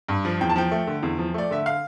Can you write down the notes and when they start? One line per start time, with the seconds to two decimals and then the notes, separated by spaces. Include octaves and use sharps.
0.09 G2
0.25 F3
0.41 E2 G5
0.49 A5
0.56 F3 G5
0.71 A3
0.87 D3
1.03 E2
1.18 F3
1.34 A3 D5
1.51 D3 E5
1.66 F5